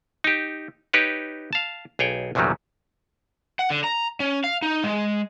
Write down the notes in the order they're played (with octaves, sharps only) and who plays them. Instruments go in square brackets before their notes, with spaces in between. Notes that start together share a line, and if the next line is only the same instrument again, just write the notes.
[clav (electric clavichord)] D#4 G4
D#4 G4 B4 C#5
F5 A5
B1 G#4 C#5 G5
A#1 E2 C3 D#3 F#3 G3
[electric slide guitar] F#5
D3
A#5
C#4
F5
D#4
G#3